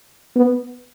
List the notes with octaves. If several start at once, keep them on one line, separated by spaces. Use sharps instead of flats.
B3